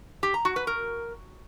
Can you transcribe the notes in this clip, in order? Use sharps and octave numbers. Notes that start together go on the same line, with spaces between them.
G4
A#5
F#4
B4
A#4